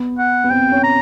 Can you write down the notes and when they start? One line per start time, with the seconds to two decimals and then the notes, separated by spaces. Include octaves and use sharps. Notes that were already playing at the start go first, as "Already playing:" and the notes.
Already playing: B3
0.18 F#5
0.44 B3
0.50 C4 G5
0.72 C#4
0.83 A#5